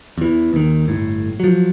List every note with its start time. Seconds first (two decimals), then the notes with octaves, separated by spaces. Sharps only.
0.18 E2 E3
0.53 D#2 D#3
0.88 G1 A2
1.40 F3 F#3